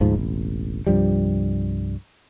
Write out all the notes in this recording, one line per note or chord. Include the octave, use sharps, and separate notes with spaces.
G1 D2 G#2 F3
E1 A1
C2 G2 F3 G3